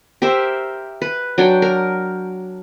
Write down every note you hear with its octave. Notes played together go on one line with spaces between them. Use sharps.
G4 A#4 C5 E5
B4
F#3 D4 G5
A#4